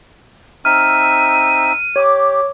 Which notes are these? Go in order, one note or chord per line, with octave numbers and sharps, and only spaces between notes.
C4 D#4 E5 F6 D#7
G4 C#5 D6